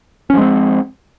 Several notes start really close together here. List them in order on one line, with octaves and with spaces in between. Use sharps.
C#4 F3 G#3 C4